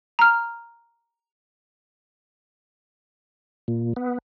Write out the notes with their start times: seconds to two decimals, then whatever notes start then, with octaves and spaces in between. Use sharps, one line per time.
0.19 A#5 F6
3.68 A#2
3.96 B3